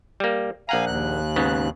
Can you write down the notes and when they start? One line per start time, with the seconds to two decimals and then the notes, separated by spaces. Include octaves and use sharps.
0.20 G3 A#3
0.69 A#1 F5 F#5 G#5 A#5
0.87 D#2 F#6
1.36 G#2 C#3 B3